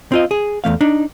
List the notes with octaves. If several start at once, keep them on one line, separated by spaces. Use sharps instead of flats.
C4 F4 D#5
G#4
E2 F3 A3 F5
D4 D#4